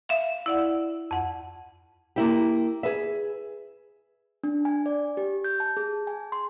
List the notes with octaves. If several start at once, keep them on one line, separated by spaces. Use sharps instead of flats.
E5 F5
E4 D5 F#5
F2 F#5
A#3 E4 G4
G#4 B4 E5
D4
G#5
D5
G4
G6
A5
G#4
G#5
C6